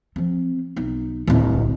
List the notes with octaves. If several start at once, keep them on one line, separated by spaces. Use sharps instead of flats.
F3 C4
B1 D#4
D1 C2